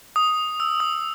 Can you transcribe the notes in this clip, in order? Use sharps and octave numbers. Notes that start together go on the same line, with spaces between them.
D#6
E6
D#6